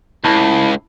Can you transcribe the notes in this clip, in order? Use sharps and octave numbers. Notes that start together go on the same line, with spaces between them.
C#2 E4 A5